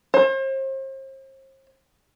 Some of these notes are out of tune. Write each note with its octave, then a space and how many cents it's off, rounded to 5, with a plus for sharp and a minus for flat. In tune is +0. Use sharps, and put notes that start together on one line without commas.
C5 +40